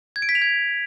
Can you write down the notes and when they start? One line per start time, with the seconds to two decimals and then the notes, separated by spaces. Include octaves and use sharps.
0.16 G#6
0.22 D7
0.29 B6
0.35 F7
0.42 G#6